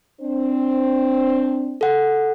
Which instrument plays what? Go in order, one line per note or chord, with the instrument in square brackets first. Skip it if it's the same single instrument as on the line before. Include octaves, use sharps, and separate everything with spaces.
[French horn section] C4 D4 C5
[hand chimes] A4 F#5